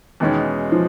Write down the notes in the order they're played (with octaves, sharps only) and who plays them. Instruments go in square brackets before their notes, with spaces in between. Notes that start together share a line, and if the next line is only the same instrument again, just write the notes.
[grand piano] E2 B2 G#3 C#4 [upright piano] D#3
[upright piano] F3